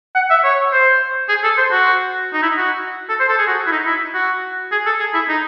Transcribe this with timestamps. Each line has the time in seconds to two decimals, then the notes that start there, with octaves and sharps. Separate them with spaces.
0.15 F#5
0.30 E5
0.44 C#5
0.73 C5
1.29 G#4
1.44 A4
1.58 C5
1.72 F#4
2.34 D#4
2.43 E4
2.58 F#4
3.09 A4
3.20 C5
3.29 A4
3.39 G#4
3.48 F#4
3.67 E4
3.72 D#4
3.86 E4
4.14 F#4
4.72 G#4
4.86 A4
5.00 G#4
5.14 E4
5.29 D#4